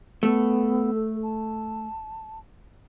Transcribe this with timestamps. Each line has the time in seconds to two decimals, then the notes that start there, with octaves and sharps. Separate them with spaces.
0.23 A3 B3
0.95 A4
1.23 A5